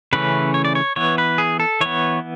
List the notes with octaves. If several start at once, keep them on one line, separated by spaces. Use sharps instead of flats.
C#3 E3 A3 C#4 B4
C#5
D5
C#5
E3 B3 C#5
B4
G#4
A4
E3 B3 C#5